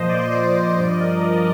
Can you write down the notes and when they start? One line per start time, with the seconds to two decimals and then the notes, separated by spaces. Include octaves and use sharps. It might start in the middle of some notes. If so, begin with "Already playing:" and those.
Already playing: A#2 F3 C5 D#5
0.09 D5
0.21 D#5
0.32 D5
0.43 D#5
0.55 D5
0.66 D#5
0.77 G2 F3 D5
0.89 D#5
1.00 A#4 D5